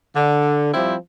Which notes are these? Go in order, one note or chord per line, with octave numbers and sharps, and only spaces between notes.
D3
F3 G3 C4 E4